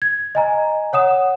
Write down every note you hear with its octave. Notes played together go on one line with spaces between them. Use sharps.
G#6
D#5 G#5 A#5
C#5 F#5 D#6 E7